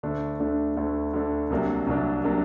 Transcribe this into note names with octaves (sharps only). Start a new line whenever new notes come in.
D2 D3 A3 D4
D2 D3 A3 D4
D2 D3 A3 D4
D2 D3 A3 D4
C2 C3 F#3 A#3 D4
C2 C3 F#3 A#3 D4
C3 F#3 A#3 D4